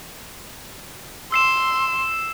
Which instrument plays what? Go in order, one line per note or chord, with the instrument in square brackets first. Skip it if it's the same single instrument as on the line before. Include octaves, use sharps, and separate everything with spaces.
[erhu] C6 [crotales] E6 C7 E7